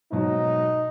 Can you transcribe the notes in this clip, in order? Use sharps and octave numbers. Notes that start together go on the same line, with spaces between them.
G#2 B2 F#3 D#4